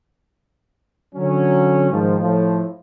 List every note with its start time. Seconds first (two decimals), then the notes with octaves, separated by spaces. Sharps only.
1.15 D3 F#3 C#4
1.91 G#2 D#3 F3
2.21 A2 F3